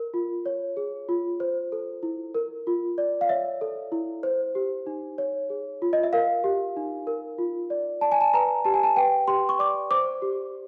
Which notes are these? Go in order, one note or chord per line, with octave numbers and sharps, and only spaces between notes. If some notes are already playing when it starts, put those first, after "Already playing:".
Already playing: A#4
F4
C#5
G#4
F4
C5
A4
E4
A#4
F4
D5
F5
C#5 E5
A4
E4
C5
G4
D#4
C#5
G#4
F4
D#5
E5
A#4 F5
G4
D#4
A#4
F4
D5
D5 A5
G#5
A5
B4 A#5
G4 A5
G#5
A5
B4 G5
G4 C6
C#6
D5 D6
C5 D6
G4